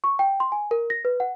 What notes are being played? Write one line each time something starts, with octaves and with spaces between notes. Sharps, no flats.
C#6
G5
C6
G#5
A#4
A#6
B4
F#5